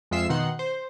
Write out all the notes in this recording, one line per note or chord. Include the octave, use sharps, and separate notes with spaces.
F2 G#3 F4 E5 C7 E7
B2 D#3 D#4 F#5 C6
C5